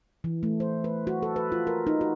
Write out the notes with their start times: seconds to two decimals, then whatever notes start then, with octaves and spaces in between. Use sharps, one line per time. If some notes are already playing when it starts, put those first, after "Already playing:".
0.24 E3
0.43 A3
0.60 C5
0.84 B4
1.07 F#4
1.22 A4
1.36 B4
1.52 F4
1.67 A#4
1.87 D#4
2.01 F#4